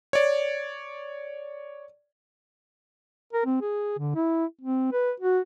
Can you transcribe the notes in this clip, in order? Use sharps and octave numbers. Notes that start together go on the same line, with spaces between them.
C#5 D5
A#4
C4
G#4
D3
E4
C4
B4
F#4